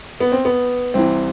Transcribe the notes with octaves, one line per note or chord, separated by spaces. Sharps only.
B3
C4
B3
C2 C3 E3 C4